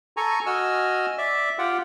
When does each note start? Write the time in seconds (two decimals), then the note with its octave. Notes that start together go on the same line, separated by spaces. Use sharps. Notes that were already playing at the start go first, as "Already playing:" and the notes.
0.17 A4 G#5 A#5 C#6
0.46 F#4 D#5 G#5 E6 F6
1.18 D5 E5
1.59 F4 G4 F#5 G5